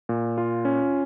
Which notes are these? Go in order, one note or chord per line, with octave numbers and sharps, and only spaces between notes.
A#2
F4
C#4